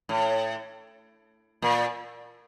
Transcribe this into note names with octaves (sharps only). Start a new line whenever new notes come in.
A2
A#2